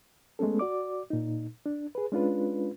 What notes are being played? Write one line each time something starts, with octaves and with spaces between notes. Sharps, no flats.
G#3 A3 B3 C#4 A4
F#4 D5 D6
A#2 D#4
D4
G#4 B4
G#3 C#4 D4 F4 B4